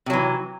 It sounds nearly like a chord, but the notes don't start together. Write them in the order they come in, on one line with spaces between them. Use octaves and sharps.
C3 F#3 E3